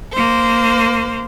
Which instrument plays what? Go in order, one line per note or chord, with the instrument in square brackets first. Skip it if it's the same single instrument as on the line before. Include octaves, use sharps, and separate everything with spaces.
[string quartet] A#3 C5